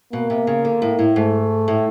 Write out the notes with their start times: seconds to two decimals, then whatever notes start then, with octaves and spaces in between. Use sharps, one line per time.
0.13 B2 A#3
0.30 C3
0.47 C#3
0.65 D3
0.82 A2
0.99 A2
1.16 G#2 A3
1.68 A2